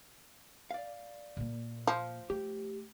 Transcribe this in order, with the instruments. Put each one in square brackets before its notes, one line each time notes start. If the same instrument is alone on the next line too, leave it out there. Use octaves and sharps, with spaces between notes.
[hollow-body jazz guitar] D5 F5
[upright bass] A#2 A#3
[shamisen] F3
[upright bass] A3 [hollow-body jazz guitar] G4